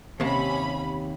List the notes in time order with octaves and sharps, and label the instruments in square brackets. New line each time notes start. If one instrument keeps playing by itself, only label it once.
[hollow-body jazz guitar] D#2 C3 [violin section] C#4 B5